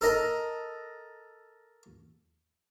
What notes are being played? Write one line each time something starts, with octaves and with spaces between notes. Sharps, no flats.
A4 A#4 D#5 A5 A#5